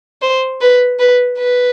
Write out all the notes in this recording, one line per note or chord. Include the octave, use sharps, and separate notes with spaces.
C5
B4
B4
B4